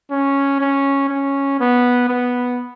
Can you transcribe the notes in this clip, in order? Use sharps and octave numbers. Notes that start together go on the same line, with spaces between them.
C#4
C#4
C#4
B3
B3